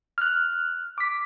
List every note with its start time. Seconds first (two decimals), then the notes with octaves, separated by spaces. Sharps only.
0.18 F6 F#6
0.98 D6 B6